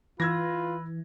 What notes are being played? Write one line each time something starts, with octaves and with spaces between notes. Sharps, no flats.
E3 F4 B4 E6 G#6 A#6